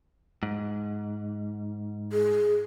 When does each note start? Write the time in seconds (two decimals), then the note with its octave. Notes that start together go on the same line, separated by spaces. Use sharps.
0.43 G#2
2.13 G#4